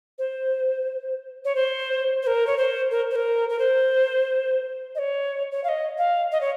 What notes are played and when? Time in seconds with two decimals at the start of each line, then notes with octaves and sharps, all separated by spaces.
0.19 C5
1.45 C#5
1.55 C5
2.23 C5
2.27 A#4
2.47 C#5
2.58 C5
2.91 A#4
3.11 C5
3.15 A#4
3.49 A#4
3.59 C5
4.95 D#5
4.99 C#5
5.52 C#5
5.64 F5
5.68 D#5
5.98 F5
6.32 D#5
6.41 C#5